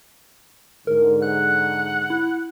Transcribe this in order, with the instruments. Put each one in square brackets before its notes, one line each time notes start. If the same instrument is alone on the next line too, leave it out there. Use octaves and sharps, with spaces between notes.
[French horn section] G#2 D3 [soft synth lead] A#4
[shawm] F#5 [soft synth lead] F#6
[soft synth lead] E4